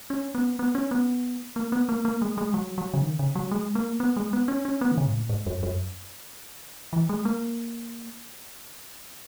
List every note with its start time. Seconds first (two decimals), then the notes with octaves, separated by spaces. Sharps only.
0.10 C#4
0.35 B3
0.59 B3
0.75 C#4
0.91 B3
1.56 A#3
1.72 B3
1.89 A#3
2.05 A#3
2.22 G#3
2.38 G#3
2.54 F#3
2.78 F#3
2.93 C#3
3.02 D#3
3.19 C#3
3.35 F#3
3.51 G#3
3.75 A#3
4.00 B3
4.17 G#3
4.33 B3
4.48 C#4
4.65 C#4
4.81 B3
4.92 D#3
4.97 C#3
5.07 G#2
5.14 A#2
5.29 G#2
5.46 F#2
5.63 F#2
6.93 E3
7.09 G#3
7.25 A#3